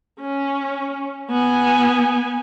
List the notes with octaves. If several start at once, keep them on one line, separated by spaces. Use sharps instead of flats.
C#4
B3 G#5